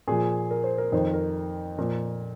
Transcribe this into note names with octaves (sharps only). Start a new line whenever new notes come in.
A#2 F3 G#4
A#4
C5
A#4
F2 D#3 C5
A#4
A#2 F3 A#4